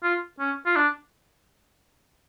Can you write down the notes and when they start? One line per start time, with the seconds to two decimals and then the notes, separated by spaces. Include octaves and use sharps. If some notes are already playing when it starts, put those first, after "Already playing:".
0.03 F4
0.40 C#4
0.66 F4
0.76 D4